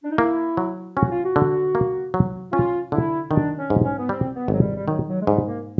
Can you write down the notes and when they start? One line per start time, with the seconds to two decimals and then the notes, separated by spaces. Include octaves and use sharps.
0.04 D4
0.11 D#4
0.18 A#3 E4
0.57 F#3
0.97 C#4 F#4
1.11 F4
1.24 F#4
1.36 D3
1.75 A#3
2.14 F#3
2.52 C#4 F4
2.92 D3 E4
3.31 D#3 D4
3.58 C#4
3.70 G#2
3.84 C#4
3.98 B3
4.09 G3 C4
4.35 B3
4.48 G#1 F#3
4.61 G3
4.76 G3
4.87 D#3 F#3
5.08 F#3
5.21 G#3
5.26 G#2 G3
5.46 A#3